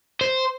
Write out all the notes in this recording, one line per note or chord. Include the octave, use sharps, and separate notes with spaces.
C5